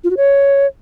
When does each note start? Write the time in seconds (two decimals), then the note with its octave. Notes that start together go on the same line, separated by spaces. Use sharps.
0.04 F4
0.10 F#4
0.17 C#5